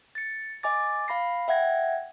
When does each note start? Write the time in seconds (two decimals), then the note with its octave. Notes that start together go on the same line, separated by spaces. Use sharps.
0.15 A6 C#7
0.63 D#5 G#5 D6 A6
1.08 F5 B5 A#6 C7
1.48 E5 F#5 G5 G#6 A#6